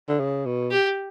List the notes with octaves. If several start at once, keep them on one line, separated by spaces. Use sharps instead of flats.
D3
C#3
B2
G4